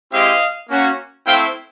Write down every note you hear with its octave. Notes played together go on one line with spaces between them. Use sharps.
G#3 C4 E4 G4 D#5 F5
A#3 C#4 F#4
A3 C4 E4 F5 G5